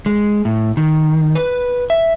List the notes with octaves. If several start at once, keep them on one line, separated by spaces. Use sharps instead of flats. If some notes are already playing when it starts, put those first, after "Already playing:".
G#3
A2
D#3
B4
E5